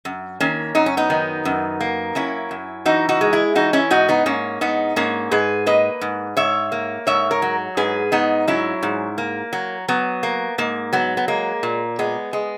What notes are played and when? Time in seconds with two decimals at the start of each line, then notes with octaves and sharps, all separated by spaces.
0.05 F#2
0.40 D#3 A#3 C#4
0.75 F#2 D#4
0.86 C#4
0.97 B3 D#4
1.10 D#3
1.45 F#2
1.81 A#3
2.15 F#2 C#4 E4
2.51 F#2
2.85 E3 D#4 F#4
3.09 D#4 F#4
3.21 G#3
3.33 E4 G#4
3.55 E3 D#4 F#4
3.73 C#4 E4
3.91 G#2 D#4 F#4
4.09 B3 D#4
4.26 G#2 A#3 C#4
4.61 G#2 B3 D#4
4.96 G#2 A#3 C#4
5.31 G#2 G#4 B4
5.66 A#3 B4 D#5
6.01 G#2
6.37 G#2 C#5 E5
6.72 A#3
7.07 G#2 C#5 E5
7.31 A#4 C#5
7.42 F#3
7.77 G#2 G#4 B4
8.12 G#2 B3 D#4
8.48 F#3 C#4 E4
8.83 G#2
9.18 A#3
9.53 F#3
9.88 F#3 B3
10.23 A#3
10.58 G#2 A#3
10.93 F#3 B3
11.17 B3
11.28 G#3 A#3
11.63 A#2
11.99 G#3 B3
12.33 G#3